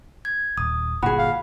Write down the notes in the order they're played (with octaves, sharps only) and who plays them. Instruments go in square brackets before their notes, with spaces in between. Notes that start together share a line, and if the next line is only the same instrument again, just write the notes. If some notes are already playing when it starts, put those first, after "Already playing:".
[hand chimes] G#6
[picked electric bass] D#1 [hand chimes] D#6
[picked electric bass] G1 A#2 [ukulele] F#4 G#4 [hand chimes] B5
[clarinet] F5